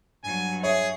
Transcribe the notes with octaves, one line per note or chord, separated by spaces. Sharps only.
G2 F#3 G#5
G#4 C#5 E5